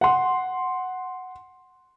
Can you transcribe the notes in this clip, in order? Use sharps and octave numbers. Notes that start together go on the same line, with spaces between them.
F#5 C6